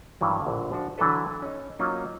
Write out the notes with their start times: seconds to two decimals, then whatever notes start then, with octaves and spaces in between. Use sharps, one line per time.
0.21 G2 D#3 E3 F#3
0.42 A#1 A2 D3
0.72 F3 D4 F#4
0.98 D3 E3 F#3 D4 A4 B4
1.42 C#4 D#4
1.79 F#3 A#3 C#4 D#4 F4